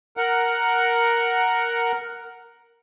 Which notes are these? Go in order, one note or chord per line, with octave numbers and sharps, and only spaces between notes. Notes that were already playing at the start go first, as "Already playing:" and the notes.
A#4 F#5